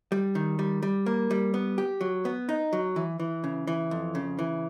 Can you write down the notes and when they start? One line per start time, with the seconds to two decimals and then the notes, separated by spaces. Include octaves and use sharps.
0.12 G3
0.35 D#3
0.59 G3
0.83 G3
1.06 A#3
1.31 G3
1.54 B3
1.78 G4
2.01 F#3
2.25 B3
2.49 D#4
2.73 F#3
2.96 E3
3.20 E3
3.44 C#3
3.67 E3
3.91 F2
4.15 C#3
4.39 E3